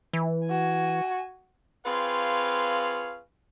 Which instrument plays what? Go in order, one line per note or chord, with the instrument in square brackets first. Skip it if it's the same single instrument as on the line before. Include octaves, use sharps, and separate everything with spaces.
[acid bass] E3
[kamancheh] F#4 G#5
[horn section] C4 F4 G#4 B4 C#5 F5